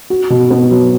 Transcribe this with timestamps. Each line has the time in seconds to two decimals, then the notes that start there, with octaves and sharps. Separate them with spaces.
0.10 F#4
0.30 B2
0.50 B3
0.70 F#3